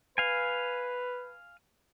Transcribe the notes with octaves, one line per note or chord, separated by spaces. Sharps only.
B4 F5 G#5